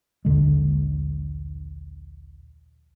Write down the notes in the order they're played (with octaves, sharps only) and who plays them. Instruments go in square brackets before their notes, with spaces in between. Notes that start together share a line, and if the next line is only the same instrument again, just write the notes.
[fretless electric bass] A#1 D#2 D3 G#3